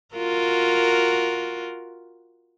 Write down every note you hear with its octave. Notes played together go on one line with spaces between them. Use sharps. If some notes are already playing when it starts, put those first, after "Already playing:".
F4 F#4 A#4